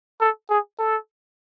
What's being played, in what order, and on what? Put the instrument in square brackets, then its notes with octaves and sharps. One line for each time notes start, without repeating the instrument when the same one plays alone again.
[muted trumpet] A4
G#4
A4